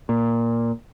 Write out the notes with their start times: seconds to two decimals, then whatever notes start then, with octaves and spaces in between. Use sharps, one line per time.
0.09 A#2